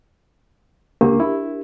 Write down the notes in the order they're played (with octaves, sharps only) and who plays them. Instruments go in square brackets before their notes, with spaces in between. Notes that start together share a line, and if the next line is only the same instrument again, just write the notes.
[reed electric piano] C#2 A#3 [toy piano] D4 G4 A#4
[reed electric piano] E4